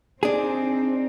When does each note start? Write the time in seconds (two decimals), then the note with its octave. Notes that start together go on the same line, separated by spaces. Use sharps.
0.23 C4 D4 D#4 G#4